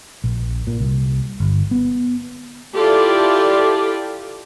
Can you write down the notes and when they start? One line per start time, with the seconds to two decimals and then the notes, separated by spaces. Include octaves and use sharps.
0.24 A#1
0.67 A#2
0.80 C2
1.40 G1
1.71 B3
2.75 E4 F4 G4 A4 D5